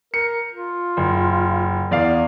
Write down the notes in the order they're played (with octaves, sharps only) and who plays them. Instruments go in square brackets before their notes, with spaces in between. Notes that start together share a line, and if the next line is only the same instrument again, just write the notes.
[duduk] A#4 [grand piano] C#7
[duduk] F4
[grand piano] F#1
[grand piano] E2 D5 F5 [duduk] B3